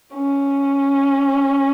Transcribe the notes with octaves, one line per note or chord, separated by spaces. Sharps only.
C#4